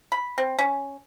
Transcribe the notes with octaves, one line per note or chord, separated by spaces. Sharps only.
B5
C4
C#4